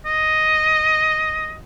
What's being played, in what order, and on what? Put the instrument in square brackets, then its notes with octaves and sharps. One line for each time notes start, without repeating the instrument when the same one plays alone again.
[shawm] D#5